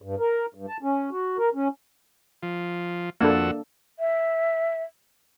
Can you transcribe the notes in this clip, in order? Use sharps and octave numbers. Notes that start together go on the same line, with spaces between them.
G2
A#4
G2
A5
C#4
F#4
A#4
C#4
F3
F2 A#3 D4 F#4 A4 E6
E5